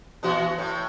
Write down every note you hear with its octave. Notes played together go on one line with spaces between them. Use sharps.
A#2 E3 F#4
A2